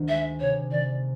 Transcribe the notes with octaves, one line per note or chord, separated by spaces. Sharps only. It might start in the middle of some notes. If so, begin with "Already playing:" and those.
Already playing: D2 D#3
G#3 E5
C3 C#5
D#3 D5